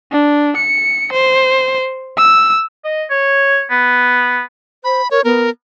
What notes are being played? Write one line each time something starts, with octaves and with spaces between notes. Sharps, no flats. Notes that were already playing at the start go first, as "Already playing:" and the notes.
D4
C#7
C5
E6
D#5
C#5
B3
C5 B5
A#4 C#5
B3 A#4